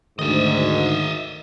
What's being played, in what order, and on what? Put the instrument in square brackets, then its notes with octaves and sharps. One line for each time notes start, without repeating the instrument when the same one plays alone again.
[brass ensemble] D2 G#2 [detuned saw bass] D#3 [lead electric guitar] D#5 E5